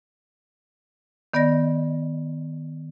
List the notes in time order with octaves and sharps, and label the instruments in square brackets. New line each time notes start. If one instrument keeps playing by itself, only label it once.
[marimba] D#3 B3 D5 D#5 A#6